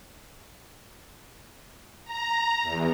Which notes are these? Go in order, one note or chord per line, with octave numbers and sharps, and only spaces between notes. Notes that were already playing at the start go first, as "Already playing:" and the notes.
A#5
E2